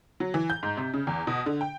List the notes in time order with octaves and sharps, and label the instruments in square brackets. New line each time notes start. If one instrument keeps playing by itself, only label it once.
[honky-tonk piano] F#3
E3
G6
G#2
C3
C#3
E2
B2
D3
G5